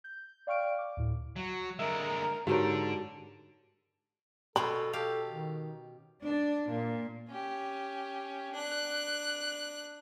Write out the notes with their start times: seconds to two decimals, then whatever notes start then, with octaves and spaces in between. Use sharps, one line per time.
0.04 G6
0.47 D5 F5 G5 C#6 F6 D7
0.78 D6
0.97 D2 A2
1.36 F#3
1.79 D3 G#3 A#4 E5
2.47 G#2 D3 F#4 G4 A#4 C#5 A5
4.56 B2 C#4 A4 B5 C6
4.93 G4 A4 F5
5.28 D#3
6.23 D4
6.70 A#2
7.28 C#4 G4
8.53 D4 F#6